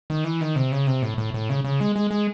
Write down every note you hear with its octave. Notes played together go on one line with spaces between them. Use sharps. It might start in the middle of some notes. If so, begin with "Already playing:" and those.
D#3
E3
D#3
C3
C#3
C3
A2
A2
A2
C#3
C#3
G#3
G#3
G#3